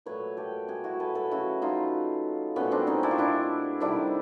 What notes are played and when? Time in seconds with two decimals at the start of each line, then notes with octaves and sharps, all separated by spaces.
0.06 A#2 F#3 A3 B4 C#5
0.37 G4 A4
0.68 F#4 G#4
0.84 E4 F#4
1.00 A4 B4
1.15 A4 B4
1.31 C#3 F#3 A3 E4 F#4
1.62 D#4 F4
2.56 A#2 F#3 A3 B3 C#4
2.71 C4 D4
2.87 C#4 D#4
3.03 D4 E4
3.11 F4
3.18 D4 E4
3.80 C3 D#3 G3 D4 E4